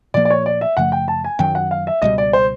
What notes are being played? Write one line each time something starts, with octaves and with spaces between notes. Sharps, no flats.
A#2 F3 A#3 D5
D5
C#5
D5
E5
F#2 C#3 F3 A3 F#5
G5
A5
G#5
F#2 D#3 F#3 G5
F#5
F5
E5
C#2 B2 G3 D#5
D5
C5